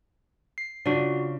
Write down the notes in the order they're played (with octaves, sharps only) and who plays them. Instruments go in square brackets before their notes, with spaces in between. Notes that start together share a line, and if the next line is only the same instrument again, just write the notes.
[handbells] C7
[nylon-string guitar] C#3 D4 [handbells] F4 F#4 D5